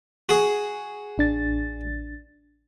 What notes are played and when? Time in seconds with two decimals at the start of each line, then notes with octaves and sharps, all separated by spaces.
0.29 F#4 G#4
1.18 A1 D4 A6